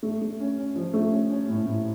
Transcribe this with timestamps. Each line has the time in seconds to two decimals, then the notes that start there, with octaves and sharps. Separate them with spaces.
0.03 A3
0.21 A3
0.40 C#4
0.57 C#4
0.76 F3
0.93 A3
1.11 C#4
1.30 C#4
1.49 A2
1.66 A2